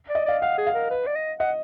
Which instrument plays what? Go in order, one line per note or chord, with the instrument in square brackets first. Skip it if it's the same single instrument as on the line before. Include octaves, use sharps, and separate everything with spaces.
[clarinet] D5
[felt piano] D#5
[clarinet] D5 [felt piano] F5
[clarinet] F5 [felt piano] F#5
[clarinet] G#4
[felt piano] F5
[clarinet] A#4
B4
D5
D#5
[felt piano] D#5 [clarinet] F#5